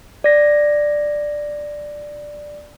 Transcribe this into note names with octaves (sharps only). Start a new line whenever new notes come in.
D5 A#6